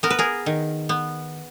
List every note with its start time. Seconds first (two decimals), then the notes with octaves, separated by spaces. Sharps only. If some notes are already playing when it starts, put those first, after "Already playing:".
0.03 B3 A#4
0.10 B4
0.19 G#4 A#4
0.46 D#3
0.89 B3